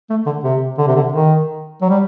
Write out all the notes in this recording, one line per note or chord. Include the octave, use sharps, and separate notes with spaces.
A3
D3
C3
D3
C3
D3
D#3
F#3
G3